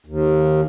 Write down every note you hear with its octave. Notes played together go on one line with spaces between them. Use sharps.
D#2